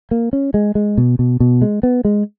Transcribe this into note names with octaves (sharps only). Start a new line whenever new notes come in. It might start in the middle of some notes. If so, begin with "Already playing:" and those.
A#3
C#4
G#3
G#3
B2
B2
B2
G#3
B3
G#3